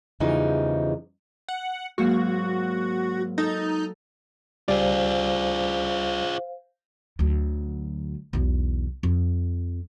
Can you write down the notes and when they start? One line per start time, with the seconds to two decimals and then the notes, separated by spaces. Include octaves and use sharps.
0.20 E2 C#3 E3 F3 G3 D#4
1.48 F#5
1.98 G#2 F#3 A#3 F#4
3.38 D#4 A4
4.68 C#2 G3 F4 G#4 C5 D5 F5
7.19 D2 F#3
8.33 B1 E2
9.03 F2